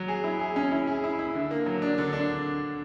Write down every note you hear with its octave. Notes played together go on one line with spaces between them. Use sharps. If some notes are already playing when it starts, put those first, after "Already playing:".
Already playing: F#3
G#4
E4
G#4
C#4
E4
G#4
E4
E4
D3
A#3
F#3
D4
D3
D4